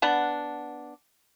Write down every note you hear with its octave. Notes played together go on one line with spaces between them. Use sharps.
B3 D4 F#5